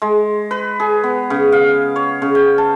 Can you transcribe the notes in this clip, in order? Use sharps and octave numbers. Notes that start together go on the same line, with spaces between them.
G#3
B4
G#4
B3
C#3
F5
C#5
C#3
G5
A5